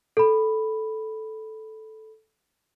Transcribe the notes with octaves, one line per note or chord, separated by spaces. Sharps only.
A4 B5